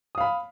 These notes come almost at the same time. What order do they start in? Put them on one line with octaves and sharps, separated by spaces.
D#6 F5 B5